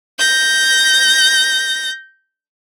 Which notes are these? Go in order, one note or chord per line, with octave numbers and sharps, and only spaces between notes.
G6 A#6